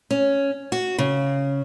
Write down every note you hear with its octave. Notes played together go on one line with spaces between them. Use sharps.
C#4
F#4
C#3